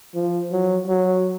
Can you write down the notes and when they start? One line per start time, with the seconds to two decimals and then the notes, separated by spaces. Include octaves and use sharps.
0.15 F3
0.52 F#3
0.88 F#3